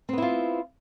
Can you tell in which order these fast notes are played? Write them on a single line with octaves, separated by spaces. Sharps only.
C4 B3 E4 F4